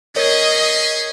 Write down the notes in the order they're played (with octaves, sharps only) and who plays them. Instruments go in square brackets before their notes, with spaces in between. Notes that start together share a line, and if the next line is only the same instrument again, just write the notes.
[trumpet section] C#4 G#4 [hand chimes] A#4 C#5 [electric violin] D#5